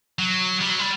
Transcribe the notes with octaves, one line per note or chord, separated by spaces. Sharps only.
F#3
G3
F#3
G3